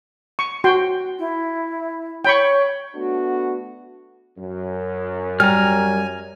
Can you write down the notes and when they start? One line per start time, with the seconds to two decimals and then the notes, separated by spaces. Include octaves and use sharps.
0.39 C#6
0.64 F#4 G5 C6
1.19 E4
2.25 C#5 G5 B5 C#6
2.95 A3 B3 D4 F#4
4.37 F#2
5.40 G3 G#5 A#5 F6